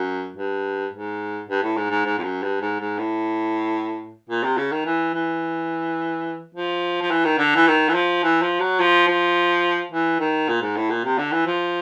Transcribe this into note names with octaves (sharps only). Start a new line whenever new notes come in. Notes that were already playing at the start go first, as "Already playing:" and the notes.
Already playing: F#2
G2
G#2
G2
A2
G#2
G#2
G#2
F2
F#2
G2
G#2
G#2
A2
A#2
C3
C#3
D#3
E3
E3
F3
F3
E3
D#3
D3
E3
D#3
E3
F3
E3
F3
F#3
F3
F3
E3
D#3
A#2
G#2
A2
A#2
C3
D3
E3
F3